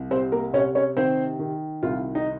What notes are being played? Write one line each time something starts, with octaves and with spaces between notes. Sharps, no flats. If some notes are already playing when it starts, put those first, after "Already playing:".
Already playing: C2
C3 C4 C5
A#3 A#4
C3 C#4 C#5
C#4 C#5
D#3 C4 C5
D#3
C2 F4
D#4